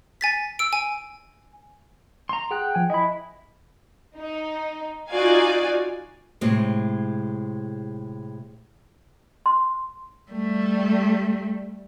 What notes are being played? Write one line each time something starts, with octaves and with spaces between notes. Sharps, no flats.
G#5 A6 B6
E6 D7
G#5
A#5 C6
G#4 F#5 G5 F#6
F3 G#5
E4 D#5 B5
D#4
D#4 F4 F#4 D5 F5 G#5
A2 C3 G#3
C6
G3 A3